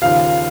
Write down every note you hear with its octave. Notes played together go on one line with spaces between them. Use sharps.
D#2 C#3 F3 F5